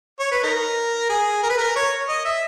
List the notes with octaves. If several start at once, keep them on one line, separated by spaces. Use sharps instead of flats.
C#5
B4
D#4 A#4
G#4
A#4
B4
A#4
C#5
D#5
E5